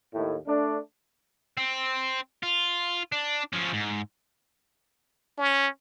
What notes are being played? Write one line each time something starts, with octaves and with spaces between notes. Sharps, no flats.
D#2 A2
A3 D4
C4
F4
D4
F3 C#4
G#2
C#4